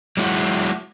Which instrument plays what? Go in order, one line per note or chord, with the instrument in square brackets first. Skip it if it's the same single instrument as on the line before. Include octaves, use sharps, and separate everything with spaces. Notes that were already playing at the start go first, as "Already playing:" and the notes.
[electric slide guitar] F#3 G#3 E4 F#4